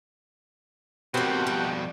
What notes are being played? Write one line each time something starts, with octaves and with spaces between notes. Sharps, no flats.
F2 B2 A#3 C4 F#4 G4
G3